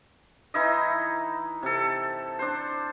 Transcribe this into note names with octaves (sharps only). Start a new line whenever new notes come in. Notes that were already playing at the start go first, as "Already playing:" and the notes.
E3 D#4 E4 D#5
C3 A4
D4 C5